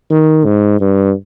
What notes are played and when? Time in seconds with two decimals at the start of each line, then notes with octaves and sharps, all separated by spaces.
0.10 D#3
0.45 G#2
0.80 G2